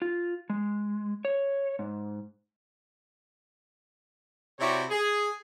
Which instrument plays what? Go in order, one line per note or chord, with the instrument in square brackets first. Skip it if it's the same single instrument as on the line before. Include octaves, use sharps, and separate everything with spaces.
[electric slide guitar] F4
G#3
C#5
G#2
[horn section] C3 E4 F#4 G4 C#5 D5
G#4